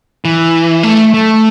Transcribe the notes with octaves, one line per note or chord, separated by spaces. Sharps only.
E3
A3
A3